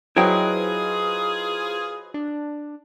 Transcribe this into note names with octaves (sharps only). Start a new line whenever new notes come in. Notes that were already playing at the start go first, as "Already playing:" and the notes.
F#3 E4 F4 G#4 B4 C5 D#5 G5
D4